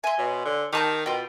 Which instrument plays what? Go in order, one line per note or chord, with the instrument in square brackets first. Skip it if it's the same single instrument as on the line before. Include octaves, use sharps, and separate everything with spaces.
[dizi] E5 [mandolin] G#5 C6
[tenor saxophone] B2 [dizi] C#5
[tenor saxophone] D3
[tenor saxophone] D#3 [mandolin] G4 A5 G6 [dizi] A#4
[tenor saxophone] B2 [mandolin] F4 G5